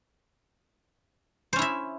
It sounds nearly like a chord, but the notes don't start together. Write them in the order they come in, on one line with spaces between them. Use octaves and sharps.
C5 C#4 E4 E5